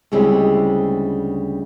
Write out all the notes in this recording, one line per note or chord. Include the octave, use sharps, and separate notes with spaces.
D2 C#3 G3 G#3 C4 E4